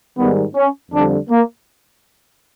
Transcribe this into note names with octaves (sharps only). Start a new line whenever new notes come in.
G#2 D#3 G3 B3
C#4
F2 D3 G3 D4
A#3